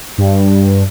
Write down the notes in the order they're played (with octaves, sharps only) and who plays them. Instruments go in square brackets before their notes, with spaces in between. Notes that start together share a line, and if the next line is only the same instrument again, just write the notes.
[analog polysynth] G2